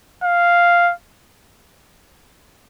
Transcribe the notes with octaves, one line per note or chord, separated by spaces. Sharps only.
F5